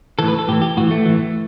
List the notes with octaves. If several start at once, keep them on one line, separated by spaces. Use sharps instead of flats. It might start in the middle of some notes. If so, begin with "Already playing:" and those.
A2 E3 A4
B4
A4
A2 E3 G4
G4
A2 E3 F#4
A3
A2 E3